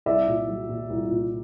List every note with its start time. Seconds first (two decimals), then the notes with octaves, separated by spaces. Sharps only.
0.06 C2 D5 E5
0.28 A#2
0.48 F#3
0.69 A#2
0.90 C2
1.11 A#2